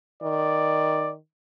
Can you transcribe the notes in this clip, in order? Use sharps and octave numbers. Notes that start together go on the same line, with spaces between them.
D#3 D5